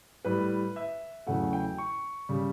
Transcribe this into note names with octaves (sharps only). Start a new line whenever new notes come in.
A2 G3 B4
E5
E2 C#3 F#3 A3 F#5
G5
C#6
C#3 G3